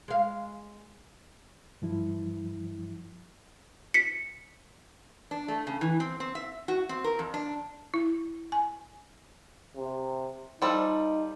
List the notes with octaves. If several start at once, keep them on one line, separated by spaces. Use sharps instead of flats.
G#3 F5
G2 F3 E4
B6 C#7
D4
A3
C#3
E3
C4
C4
E5
F#4
C4
A#4
F2
D4
E4
G#5
C3
F3 G3 D#4 A4